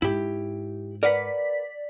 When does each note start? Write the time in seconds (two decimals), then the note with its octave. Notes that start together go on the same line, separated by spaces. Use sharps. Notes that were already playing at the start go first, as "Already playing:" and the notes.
0.02 G#2 E4 G4
1.03 A#4 B4 D5 F#5 B6